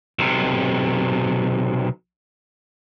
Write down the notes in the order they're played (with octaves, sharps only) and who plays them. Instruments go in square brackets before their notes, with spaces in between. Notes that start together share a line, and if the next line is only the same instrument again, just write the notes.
[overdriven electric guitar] B1 C3